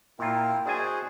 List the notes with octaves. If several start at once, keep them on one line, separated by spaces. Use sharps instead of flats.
A#2 E4 F4 A#4 G5
D4 F#4 G#4 C5 D#5 G#5 D#6